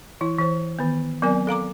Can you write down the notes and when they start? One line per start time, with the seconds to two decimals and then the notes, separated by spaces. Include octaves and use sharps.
0.21 E3 E4
0.39 E3 C5
0.79 D#3 B3
1.22 F#3 B3 C4 A#4 D5 G#5
1.47 A4 F5 A#5 D6